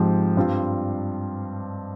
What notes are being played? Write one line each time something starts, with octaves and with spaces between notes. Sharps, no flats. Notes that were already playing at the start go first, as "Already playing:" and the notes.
Already playing: G#2 F3 C4 G4
G2 G3 C4 F4